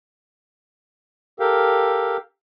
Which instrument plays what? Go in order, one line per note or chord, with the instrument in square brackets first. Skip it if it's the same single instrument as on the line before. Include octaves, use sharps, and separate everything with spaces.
[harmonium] G4 A4 A#4 F5 G5